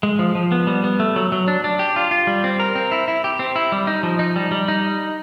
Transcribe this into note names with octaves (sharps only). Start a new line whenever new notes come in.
G#3
F3
F3
B3
G3
B3
A3
F#3
F#3
D4
D4
G4
F4
F4
G3
C4
A#4
C4
E4
E4
G4
C4
E4
G3
D#4
F3
D#4
G3
G3
D#4